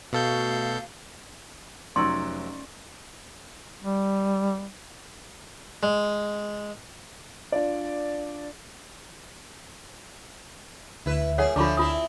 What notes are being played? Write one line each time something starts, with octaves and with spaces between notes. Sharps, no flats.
B2 A3 F#4 A4 F5 G6
F1 F#3 C#4 D#4 D5 C6 E6
G3
G#3
D4 F4 D5
D2 E4 B4
A#2 G3 G#4 C#5 F#5
D2 F3 A3 D4 F4 A#4 C#6 D6
C4 E4 F4 D#6